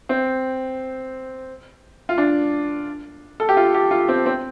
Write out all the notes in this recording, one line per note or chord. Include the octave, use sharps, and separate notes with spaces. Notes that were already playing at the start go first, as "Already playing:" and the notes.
C4
F4
D4
A4
G4
F4
G4
F4
C4
C4